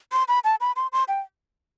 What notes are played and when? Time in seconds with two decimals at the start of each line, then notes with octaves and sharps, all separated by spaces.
0.13 C6
0.28 B5
0.44 A5
0.61 B5
0.76 C6
0.93 C6
1.08 G5